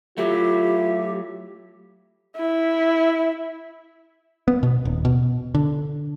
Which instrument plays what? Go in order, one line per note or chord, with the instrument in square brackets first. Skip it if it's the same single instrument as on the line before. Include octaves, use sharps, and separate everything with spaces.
[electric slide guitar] F#3 A3 [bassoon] E4 [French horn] F4 [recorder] G4
[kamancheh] E4
[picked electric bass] B3
B2
D#1
B2
D3